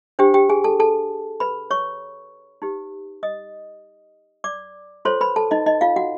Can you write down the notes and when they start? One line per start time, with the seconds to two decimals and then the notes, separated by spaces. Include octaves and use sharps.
0.19 D4 G4 C5 G5
0.34 G4 G5
0.49 G#4 G#5
0.64 A4 A5
0.80 A4 A5
1.40 B4 B5
1.71 C#5 C#6
2.62 D#4 G4 B4
3.23 D#5 D#6
4.44 D5 D6
5.05 F4 A4 C5 C#5 C6
5.21 B4 B5
5.36 A4 A5
5.51 D#4 D#5
5.66 D#4 D#5
5.81 F4 F5
5.96 F#4 F#5